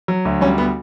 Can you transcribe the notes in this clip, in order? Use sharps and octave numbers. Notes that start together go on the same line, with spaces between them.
F#3
D2
G3 C#4
B3